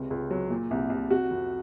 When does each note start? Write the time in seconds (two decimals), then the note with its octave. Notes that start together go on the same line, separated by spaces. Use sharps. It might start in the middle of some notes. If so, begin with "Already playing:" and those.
Already playing: C#2 C3
0.10 C#2
0.31 F#3
0.50 A#2
0.71 C2
0.90 C2
1.10 C3 F#4
1.31 F2